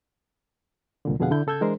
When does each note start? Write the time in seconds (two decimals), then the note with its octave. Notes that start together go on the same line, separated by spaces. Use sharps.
1.05 C2 A#2 D3
1.20 F2 B2 D3 G#4 F5 F#5
1.31 D3 E4 G6
1.47 C#3 A4 E6 G6 G#6
1.61 E3 G#3 D4 G#4 A#4 C5